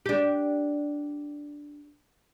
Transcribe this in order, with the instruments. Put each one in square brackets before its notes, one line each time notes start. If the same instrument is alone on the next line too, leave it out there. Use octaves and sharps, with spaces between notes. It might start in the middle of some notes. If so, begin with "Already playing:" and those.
[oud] D4 G4